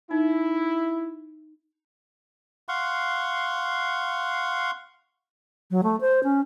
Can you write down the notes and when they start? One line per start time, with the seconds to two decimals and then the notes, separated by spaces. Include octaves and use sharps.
0.11 D#4 E4
2.69 F5 F#5 C6 C#6
5.71 F#3
5.83 A3
6.01 C5
6.24 C#4